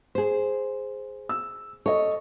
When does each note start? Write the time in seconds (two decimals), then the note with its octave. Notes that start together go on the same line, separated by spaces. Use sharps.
0.15 G#4 C5
1.29 E6
1.86 A4 C#5 D#5